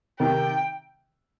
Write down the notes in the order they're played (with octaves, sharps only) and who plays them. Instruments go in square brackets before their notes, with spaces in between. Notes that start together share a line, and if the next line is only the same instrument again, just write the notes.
[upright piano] C3 D#3 [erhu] G5